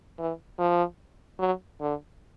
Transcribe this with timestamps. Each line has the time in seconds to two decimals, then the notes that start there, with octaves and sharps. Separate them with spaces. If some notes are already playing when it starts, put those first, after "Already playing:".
0.19 E3
0.59 F3
1.39 F#3
1.81 D3